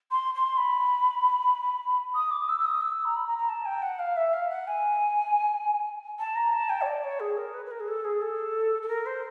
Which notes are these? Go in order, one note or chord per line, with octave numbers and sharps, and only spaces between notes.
C6
C6
B5
D#6
D6
E6
E6
D#6
E6
A#5
B5
A#5
A#5
A5
G5
F#5
F5
E5
F5
F#5
G#5
A5
A#5
A5
G5
C#5
D5
C#5
G#4
A#4
B4
B4
A#4
G#4
A4
G#4
A4
A4
A#4
C5